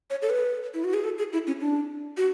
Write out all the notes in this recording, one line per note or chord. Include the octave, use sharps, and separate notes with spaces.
C#5
A4
B4
E4
F#4
G#4
A4
G#4
E4
C#4
D4
F#4